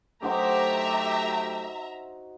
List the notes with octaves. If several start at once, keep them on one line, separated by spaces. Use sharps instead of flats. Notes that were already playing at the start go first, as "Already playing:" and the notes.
F#3 A3 D#4 F#4 G4 C5 E5 A#5